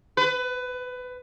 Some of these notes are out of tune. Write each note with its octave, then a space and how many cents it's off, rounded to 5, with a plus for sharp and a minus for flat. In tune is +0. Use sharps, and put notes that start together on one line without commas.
B4 +20